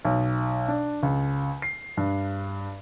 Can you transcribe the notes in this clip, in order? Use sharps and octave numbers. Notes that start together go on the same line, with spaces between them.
B1
D4
C#2
C7
G2